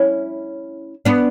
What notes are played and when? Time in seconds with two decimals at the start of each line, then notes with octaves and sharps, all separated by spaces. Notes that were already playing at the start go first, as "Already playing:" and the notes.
Already playing: C#4 E4
1.05 B3 D4